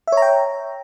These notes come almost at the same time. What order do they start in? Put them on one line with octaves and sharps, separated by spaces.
E5 C#5 A#5 G5